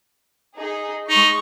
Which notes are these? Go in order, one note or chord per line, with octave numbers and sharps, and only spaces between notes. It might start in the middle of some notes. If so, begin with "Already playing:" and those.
D#4 G#4
G#3 D#4 C#6